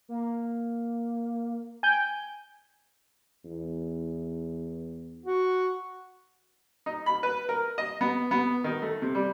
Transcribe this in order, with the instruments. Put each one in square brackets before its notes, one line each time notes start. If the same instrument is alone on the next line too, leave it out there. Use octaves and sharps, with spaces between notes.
[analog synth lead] A#3
[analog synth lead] G5 [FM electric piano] G#5 G6
[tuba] E2
[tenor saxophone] F#4
[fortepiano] D#4
B5
B4
A#4
D#5
B3
B3
D#3
A3
C3
G3